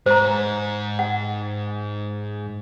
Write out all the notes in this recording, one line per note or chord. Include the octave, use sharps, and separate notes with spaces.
G#2 C5 A#5
F#5